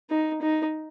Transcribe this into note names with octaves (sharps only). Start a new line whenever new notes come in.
D#4
D#4